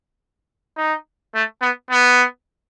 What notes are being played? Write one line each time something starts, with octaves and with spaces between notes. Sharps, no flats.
D#4
A3
B3
B3